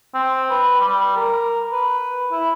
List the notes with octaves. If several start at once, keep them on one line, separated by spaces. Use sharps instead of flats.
C4
B4
G3
A#4
B4
E4